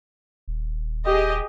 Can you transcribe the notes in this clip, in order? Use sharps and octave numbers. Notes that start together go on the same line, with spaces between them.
D#1
G4 G#4 D#5